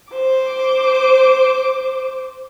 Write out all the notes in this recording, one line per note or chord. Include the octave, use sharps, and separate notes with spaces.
C5 D6